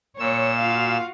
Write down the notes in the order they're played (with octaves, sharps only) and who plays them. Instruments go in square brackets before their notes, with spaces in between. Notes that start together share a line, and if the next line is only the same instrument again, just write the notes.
[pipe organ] A#2 E6 [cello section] C#5
[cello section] F4 F#4 F5